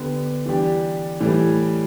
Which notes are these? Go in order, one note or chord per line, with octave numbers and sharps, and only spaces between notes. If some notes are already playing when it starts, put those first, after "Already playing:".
Already playing: D3 B3 G4 B4
E3 G3 D4 G4
A2 E3 G3